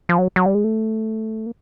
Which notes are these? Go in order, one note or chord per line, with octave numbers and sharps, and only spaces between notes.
F3
F#3
F#3
G3
G#3
A3
A#3